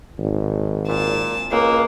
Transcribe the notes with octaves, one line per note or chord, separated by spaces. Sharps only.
G#1
A#2 A5
C#2 A#3